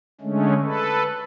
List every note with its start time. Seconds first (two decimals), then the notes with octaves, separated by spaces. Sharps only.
0.21 D3 G#3 A3 C#4
0.62 A4 B4